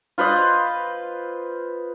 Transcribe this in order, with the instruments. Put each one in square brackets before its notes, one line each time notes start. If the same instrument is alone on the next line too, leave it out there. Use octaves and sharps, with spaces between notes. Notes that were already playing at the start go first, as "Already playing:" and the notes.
[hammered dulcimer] F4 B4 C5 D#5